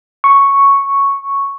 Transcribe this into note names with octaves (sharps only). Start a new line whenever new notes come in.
C#6